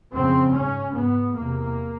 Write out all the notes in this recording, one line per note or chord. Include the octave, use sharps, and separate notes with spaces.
F2 C#3 C4
G#2 C#4
G#2 B3
E2 C3 A#3